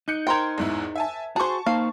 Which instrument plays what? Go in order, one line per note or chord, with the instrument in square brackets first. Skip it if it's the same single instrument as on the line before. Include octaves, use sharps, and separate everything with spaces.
[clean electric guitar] D#4 [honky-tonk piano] F#6 G6 C#7
[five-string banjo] A#4 C5 G5 [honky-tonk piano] C6 G#6
[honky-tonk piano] E2 G#2 E4
E5 G#5 A5
[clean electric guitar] F#4 [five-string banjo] G#4 C5 [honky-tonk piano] A5 C#6
[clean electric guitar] A#3 D#4 C5 [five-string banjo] F5